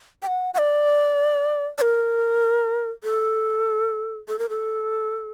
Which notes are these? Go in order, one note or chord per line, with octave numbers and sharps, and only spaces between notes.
G5
F#5
F#5
D5
D5
A#4
A4
A4
A#4
A4